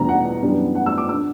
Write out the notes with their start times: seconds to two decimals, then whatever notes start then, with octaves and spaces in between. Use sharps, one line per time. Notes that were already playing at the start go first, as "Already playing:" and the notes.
Already playing: E2 B2 G3 B3 D4 A#5
0.09 F#5
0.42 F#2 E3 G3 B3 D4
0.75 F#5
0.86 E6
0.98 D6
1.09 E6
1.13 D3